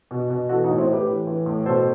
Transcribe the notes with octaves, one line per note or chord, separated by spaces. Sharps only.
B2
B2
E3 F#4 A4
D#4 F#4
A2
C4 E4
A2 G4 B4
E3
E3
A2
B2 A4 C5